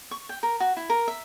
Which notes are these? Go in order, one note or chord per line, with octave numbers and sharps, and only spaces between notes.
C#6
G5
A#4
F#4
E4
A#4
E5